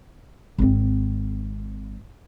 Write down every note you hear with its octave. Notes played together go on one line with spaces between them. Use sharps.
G#1 C4